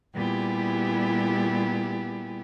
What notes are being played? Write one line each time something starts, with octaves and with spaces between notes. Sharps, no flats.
A#2 G3 B3 E4 G4 G#4